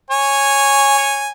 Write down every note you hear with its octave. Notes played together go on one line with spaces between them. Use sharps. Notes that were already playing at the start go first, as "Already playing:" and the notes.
C#5 G#5